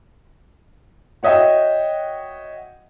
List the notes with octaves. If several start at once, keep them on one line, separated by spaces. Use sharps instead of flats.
F#4 C#5 D#5 E5 G5